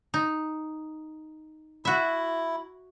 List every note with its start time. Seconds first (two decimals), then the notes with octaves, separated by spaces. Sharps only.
0.14 D#4
1.85 E4 F#4 E5